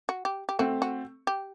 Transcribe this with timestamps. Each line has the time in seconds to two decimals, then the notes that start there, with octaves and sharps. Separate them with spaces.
0.09 F#4
0.25 G4
0.49 G4
0.59 A3 C4 F#4
0.82 F#4
1.27 G4